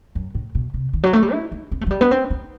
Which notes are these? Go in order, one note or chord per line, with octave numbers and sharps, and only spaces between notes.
F#2
A2
B2
C3
D#3
F#3
A3
G3
E4
D#4
C4
A3
F#3
G3
B3
C4
D#4